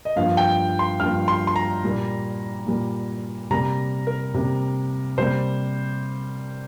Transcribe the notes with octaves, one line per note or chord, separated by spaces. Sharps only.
D#5
G2 F3 A#3 F5
G5
C6
G2 F3 A#3 F6
C6
C6
A#5
A#2 G3 A#3
A#2 G3 A#3
C3 G3 A#3 A#5
A#4
C3 G3 A#3
C3 G3 A#3 C5